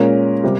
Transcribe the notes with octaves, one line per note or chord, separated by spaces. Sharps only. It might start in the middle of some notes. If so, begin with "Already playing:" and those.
Already playing: A#2 G#3 C#4 A#4
C3 G3